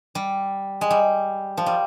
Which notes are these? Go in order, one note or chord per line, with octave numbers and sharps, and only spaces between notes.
G3
G#3
G3
F3
G3